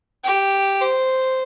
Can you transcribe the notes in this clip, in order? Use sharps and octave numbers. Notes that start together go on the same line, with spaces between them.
G4
C5